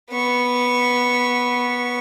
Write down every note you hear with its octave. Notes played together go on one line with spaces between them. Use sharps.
B3 C#6